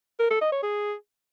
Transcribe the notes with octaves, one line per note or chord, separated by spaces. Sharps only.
A#4
A4
D#5
C#5
G#4